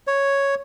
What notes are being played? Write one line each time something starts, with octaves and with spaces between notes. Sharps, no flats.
C#5